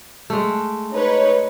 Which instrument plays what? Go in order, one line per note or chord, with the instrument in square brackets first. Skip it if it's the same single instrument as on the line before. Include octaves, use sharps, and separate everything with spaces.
[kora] G#3 A3
[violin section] D#4 B4 C#5